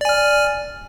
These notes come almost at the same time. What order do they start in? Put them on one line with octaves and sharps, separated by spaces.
D5 G#5 F6